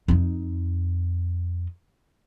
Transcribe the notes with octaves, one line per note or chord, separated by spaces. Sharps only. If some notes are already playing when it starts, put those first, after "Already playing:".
F2 D#4